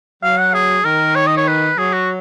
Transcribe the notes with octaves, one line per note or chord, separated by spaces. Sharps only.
F#3 F5
F#5
G#4
D#3 A#4
C#5
D#5
C#5
B4
F#3 G#4
F#4